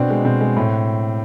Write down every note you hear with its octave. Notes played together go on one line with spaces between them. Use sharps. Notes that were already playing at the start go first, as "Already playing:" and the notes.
Already playing: B2 C4 D4
G#3
B2 C4
G#3
A2